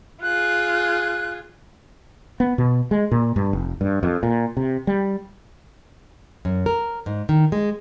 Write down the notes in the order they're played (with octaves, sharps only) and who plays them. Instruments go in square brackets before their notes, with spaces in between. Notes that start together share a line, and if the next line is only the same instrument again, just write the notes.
[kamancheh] F4 G#4 [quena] F#6
[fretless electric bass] B3
B2
G#3
A#2
G2
F1
G2
F2
A#2
C3
G3
[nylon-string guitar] F#2
A#4
G#2
D#3
G#3